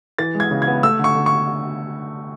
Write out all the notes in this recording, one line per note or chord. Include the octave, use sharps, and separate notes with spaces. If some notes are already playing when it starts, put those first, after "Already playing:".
E3 A6
G#3
G#6
C#3
G#6
B3
A3 E6
D3 C#6
D3
C#6